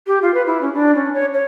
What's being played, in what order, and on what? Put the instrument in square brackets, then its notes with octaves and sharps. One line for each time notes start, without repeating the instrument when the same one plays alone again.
[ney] G4
F4
B4
E4
C#4
D4
C#4
C#5
C#5